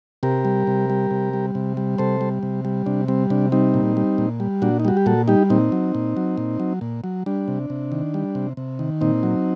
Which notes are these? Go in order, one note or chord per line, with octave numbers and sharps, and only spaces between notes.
C3 G4 A#4
G3
C3
G3
C3
G3
C3
G3
C3 A4 C5
G3
C3
G3
C3 D4
G3 C4
C3 D4
G3 C4 D#4
A#2
G3
A#2
G3
A#2 D4 F#4
D#4
G3 F#4
G4
A#2 F#4 A4
G3 D#4 G4
A#2 C4 D#4
F#3
A#2
F#3
A#2
F#3
A#2
F#3
G3 D4
C3
C3
D#3
G3
C3
C3
D#3
A#2 C4 D#4
F#3